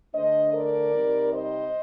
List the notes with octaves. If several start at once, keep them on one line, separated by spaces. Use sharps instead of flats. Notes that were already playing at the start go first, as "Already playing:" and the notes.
D3 A3 D4 C5 D#5
A#4 D5
C3 G3 C4 D#4
C5 D#5